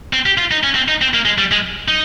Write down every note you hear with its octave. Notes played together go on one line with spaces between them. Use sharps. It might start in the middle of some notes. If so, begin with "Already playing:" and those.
C4
G4
F4
D#4
C#4
C4
D#4
C4
A#3
G#3
G3
G#3
D#4